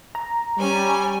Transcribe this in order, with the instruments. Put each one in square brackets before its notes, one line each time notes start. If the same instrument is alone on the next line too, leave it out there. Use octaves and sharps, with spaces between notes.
[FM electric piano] A#5
[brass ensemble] G3 [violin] C#4 G#5